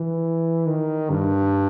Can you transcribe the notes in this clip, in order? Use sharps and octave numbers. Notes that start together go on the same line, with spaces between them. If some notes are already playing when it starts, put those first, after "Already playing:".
Already playing: E3
D#3
G2